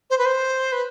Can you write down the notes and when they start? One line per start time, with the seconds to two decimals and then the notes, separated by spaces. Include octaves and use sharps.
0.10 C5
0.18 B4
0.25 C5
0.72 B4